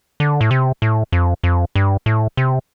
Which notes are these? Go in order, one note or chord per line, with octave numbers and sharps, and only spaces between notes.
D3
A2
C3
A2
F2
F2
G2
A2
C3